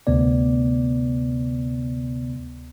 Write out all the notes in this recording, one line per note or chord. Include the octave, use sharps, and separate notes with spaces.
D2 C3 B3 D5